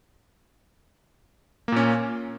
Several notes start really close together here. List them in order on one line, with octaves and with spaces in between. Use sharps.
A#3 A#2 C#4